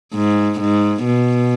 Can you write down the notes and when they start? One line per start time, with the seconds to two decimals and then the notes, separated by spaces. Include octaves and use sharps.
0.14 G#2
0.61 G#2
1.05 B2